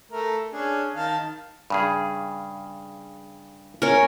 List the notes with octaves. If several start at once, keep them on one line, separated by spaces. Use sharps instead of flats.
A3 A#4
C#4 D4 G#4
D#3 F5 A5
G2 C#3 G#4
C#4 A#4